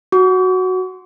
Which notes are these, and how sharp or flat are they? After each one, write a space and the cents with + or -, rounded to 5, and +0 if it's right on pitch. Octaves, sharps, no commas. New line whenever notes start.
F#4 +0 C#6 +45